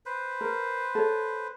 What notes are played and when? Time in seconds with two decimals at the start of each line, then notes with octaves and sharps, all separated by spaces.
0.06 B4 C5
0.41 A#4
0.95 A4 C#5